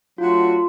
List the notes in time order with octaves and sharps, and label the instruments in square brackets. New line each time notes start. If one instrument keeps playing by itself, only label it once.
[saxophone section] F#3 A3 D4 F#4 [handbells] F4